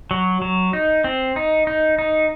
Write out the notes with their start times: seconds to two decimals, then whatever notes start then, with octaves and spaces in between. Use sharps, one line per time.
0.11 F#3
0.42 F#3
0.73 D#4
1.04 C4
1.36 D#4
1.67 D#4
1.99 D#4